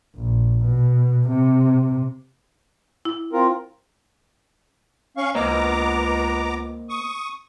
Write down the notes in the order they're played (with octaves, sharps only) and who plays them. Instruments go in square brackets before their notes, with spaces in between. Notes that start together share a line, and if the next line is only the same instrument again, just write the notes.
[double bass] A#1
B2
C3
[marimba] E4
[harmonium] C4 F4 A#4
[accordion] C#4 F5 C#6
[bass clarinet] C#2 [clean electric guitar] A#3 C5 D#5 [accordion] B3 A#5 D6
[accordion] C#6 D#6